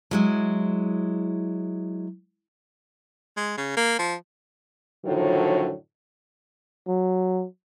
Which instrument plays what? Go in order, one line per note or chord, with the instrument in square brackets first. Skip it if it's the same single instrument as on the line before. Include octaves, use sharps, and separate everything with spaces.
[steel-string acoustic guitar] F#3 G#3 E4
[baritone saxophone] G#3
C#3
A#3
F3
[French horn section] F#2 A2 D3 D#3 F3 F#3
[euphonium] F#3